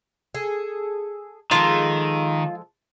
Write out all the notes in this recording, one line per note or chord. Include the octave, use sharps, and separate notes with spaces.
G#4 A4
D#3 F3 G#3 F4 A4